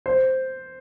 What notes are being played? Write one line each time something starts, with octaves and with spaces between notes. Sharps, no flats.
C5